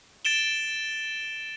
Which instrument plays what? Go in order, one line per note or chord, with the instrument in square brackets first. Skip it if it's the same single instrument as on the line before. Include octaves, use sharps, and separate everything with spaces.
[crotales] A6 D7 E7 G7